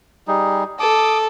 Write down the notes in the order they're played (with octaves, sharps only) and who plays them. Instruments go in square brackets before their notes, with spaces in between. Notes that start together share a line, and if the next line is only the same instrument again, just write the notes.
[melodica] G3 D#4 G#4
[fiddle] A4 [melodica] D6 D#6